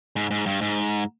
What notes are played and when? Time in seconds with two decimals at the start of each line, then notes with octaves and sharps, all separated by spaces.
0.16 G#2
0.31 G#2
0.46 G2
0.61 G#2